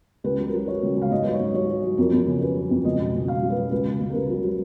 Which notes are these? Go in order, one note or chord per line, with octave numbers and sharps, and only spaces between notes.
C#2 B4
F#3
A#4
F#3
F#3 C#5
C#2
C#3 F5
G#2 D#5
F#3 B4
C#5
G#2
F#3 C#5
F#3
F#3
F2 A#4
F2
C#3
C#3 B4
F#3
F2
C#2 D#5
B2
C#2
C#2 F5
F#3
B4
F#3
C#2 B4
C#2
C#2
A#4
C#2 B4
F#3
F#3